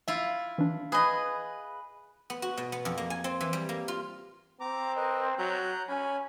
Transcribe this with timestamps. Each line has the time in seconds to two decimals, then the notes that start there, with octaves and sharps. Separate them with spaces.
0.08 E4 F4 E5
0.58 E3 D4
0.92 G#4 B4 D#5
2.30 B3
2.42 F#4
2.57 B2
2.72 B3
2.85 F2
2.98 A#3
3.10 G#5
3.24 C4
3.41 E3
3.53 G3
3.69 A#3
3.88 F4
4.60 C4 A#5 D6
4.96 A#4 B4 D#5
5.38 F#3 A#5 F#6 G6
5.89 C#4 G#5 B5